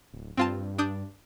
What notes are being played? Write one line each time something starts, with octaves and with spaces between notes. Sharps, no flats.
D1
G2 C4 F4 A5
D4 D#6 G6